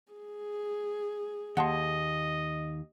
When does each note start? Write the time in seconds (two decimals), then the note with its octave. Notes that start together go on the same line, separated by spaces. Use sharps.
0.12 G#4
1.57 D#2 D#5 F#5 A5 C6